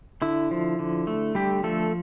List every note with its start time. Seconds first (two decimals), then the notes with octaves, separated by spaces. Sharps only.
0.22 D3 E4
0.51 F3
0.79 D3
1.07 A3
1.35 D3 G3 G4
1.63 F3 A3 A4